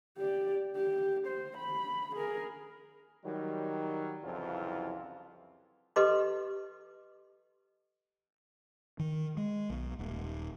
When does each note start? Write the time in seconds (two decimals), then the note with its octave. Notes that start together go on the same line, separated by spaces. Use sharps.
0.17 G4 D5
0.76 G4
1.27 C5
1.57 B5
2.16 G#4 A#4
3.25 D#3 F#3 G3
4.23 C2 F2 C#3 E3 F#3 F4
5.96 G4 A4 B4 D#5 C6 D6
8.99 D#3
9.37 G#3
9.70 B1
9.99 D#1